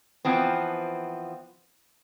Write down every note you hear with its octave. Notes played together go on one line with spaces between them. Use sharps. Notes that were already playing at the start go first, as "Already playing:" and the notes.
E3 F3 B3 C4